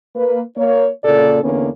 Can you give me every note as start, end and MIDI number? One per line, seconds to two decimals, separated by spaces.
0.15 0.41 58
0.15 0.41 71
0.57 0.89 58
0.57 0.89 73
1.04 1.41 46
1.04 1.41 49
1.04 1.41 58
1.04 1.41 69
1.04 1.41 74
1.43 1.68 40
1.43 1.68 50
1.43 1.68 58
1.43 1.68 59
1.43 1.68 61